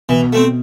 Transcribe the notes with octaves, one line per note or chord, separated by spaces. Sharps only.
B2 E3
A3 C4